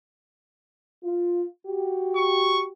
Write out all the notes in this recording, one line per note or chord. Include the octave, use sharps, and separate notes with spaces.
F4
F#4 G4
C#6